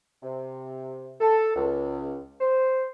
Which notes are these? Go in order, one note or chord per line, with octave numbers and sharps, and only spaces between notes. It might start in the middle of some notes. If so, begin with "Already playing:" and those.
C3
A4
C#2
C5